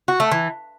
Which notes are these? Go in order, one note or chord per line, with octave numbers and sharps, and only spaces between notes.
F#4
A3
E3